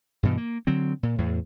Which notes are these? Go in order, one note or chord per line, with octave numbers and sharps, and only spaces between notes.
G2 B2 E3
A#3
D3 F#3 C4
A#2
E2 A2